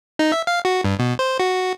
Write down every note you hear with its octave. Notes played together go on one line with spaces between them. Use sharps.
D#4
E5
F5
F#4
G2
B2
C5
F#4